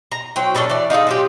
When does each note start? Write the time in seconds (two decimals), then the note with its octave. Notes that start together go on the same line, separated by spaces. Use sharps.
0.12 A#5
0.36 F#3 C5 G5
0.55 C#4 D4 A4 B4
0.70 E3 D5
0.90 D#4 F4 G#4 A4
1.07 F#3 F4 G4